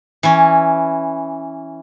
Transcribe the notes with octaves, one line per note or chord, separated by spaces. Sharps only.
E3 C#4